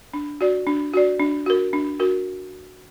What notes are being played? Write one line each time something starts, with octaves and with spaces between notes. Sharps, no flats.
D4
F#4 D5
D4
F#4 D5
D4
F#4 A#4
D4
F#4 A#4